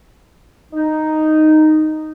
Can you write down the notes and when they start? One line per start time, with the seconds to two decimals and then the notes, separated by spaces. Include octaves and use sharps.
0.73 D#4